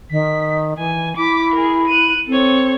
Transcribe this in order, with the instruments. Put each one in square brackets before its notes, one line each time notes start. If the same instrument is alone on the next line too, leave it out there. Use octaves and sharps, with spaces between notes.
[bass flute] D#3 [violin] B6
[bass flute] E3 [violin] G#5
[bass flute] E4 [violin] D6 B6
[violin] G#4 A#4
F#6 D#7
[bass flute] C4 [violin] A4 C#5